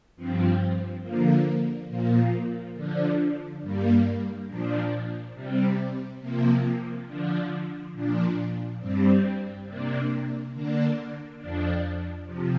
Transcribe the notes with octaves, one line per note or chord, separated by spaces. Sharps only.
G2 F3 C4
D3 F3 A#3
A#2 F3 A#3
D3 F3 D4
G2 G3 A#3
A#2 F3 D4
C3 G3 C4
C3 F3 A#3
D3 F3 D4
A#2 F3 D4
G2 G3 C4
C3 A#3 D4
D3 A#3 D4
F2 F3 D4
C3 F3